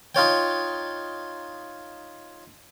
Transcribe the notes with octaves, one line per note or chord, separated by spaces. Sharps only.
D#4 F4 C#5 G5